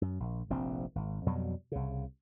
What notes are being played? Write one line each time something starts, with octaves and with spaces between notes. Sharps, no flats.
F#2
A#1
F1 A#1 C4
G#1
F2 B2 F#3 G3
C2 C#3